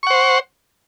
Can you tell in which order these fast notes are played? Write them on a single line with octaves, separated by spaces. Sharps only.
C#6 F#5 C5